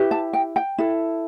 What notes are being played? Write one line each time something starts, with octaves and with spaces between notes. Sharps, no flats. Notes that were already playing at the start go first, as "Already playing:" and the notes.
Already playing: E4 G4 B4
A5
G5
G5
E4 A4